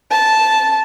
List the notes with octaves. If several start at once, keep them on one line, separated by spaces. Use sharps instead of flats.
A5